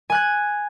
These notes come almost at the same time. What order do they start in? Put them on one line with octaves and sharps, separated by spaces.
G#5 F#6 G#6